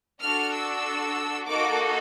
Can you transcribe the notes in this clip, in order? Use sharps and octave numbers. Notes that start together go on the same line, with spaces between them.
D4 F#4 A4 F6
E6
A#3 D#4 F#4 A4 D6